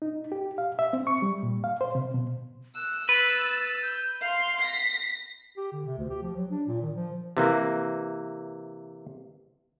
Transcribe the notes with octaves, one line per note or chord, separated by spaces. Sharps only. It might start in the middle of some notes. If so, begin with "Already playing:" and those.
D#4
G4
F5
E5
C4
C#6
G3
A#2
F5
C5
C3
B2
E6 F#6
B4 A6
G6
F5 C6 C7
A#6 B6
G4
D3
C3
D2
G4
F3
F#3
D4
A#2
D#3
F3
C3 E3 A#3